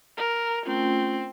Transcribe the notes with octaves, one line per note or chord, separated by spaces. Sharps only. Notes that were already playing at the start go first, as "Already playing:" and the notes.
A#4
A3 C4 C#4 F4